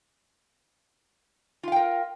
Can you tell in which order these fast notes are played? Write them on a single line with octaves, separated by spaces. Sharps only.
F4 F5 G5 A#4